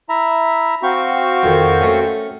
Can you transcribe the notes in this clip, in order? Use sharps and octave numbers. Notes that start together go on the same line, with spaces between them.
E4 E5 A#5
C4 F#4 F5 G5 C#6
F2 D#3
A3 C#4